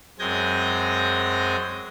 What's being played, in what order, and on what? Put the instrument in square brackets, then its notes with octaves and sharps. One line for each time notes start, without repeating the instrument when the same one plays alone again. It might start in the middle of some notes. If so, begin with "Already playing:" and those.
[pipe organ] F#2 G#3 C4 G#5 G6 A#6